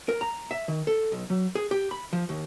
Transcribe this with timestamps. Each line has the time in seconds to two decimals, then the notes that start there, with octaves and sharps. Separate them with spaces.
0.09 A#4
0.21 A#5
0.51 E5
0.68 D#3
0.87 A4
1.12 B1
1.30 F#3
1.55 G#4
1.71 G4
1.91 B5
2.13 F3
2.29 D#2